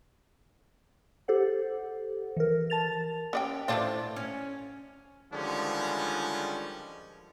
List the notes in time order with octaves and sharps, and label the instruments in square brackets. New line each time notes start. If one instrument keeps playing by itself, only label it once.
[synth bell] G4 A4 C5 F#5
E3 A#4
A5 A6 F7
[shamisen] C#4 D5 G5
[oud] A2 C5 D5 [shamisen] A3 D4 F4
[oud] C#4
[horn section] D3 D#3 F3 G3 G#3 C#4